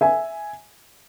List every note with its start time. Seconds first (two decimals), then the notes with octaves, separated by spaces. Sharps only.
0.01 E5 G#5